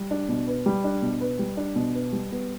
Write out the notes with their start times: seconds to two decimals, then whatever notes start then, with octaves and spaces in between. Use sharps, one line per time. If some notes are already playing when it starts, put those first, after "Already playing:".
Already playing: G3
0.11 D4
0.29 B2
0.47 B4
0.66 G3
0.84 D4
1.02 B2
1.21 B4
1.39 G3
1.57 D4
1.76 B2
1.94 B4
2.12 G3
2.31 B3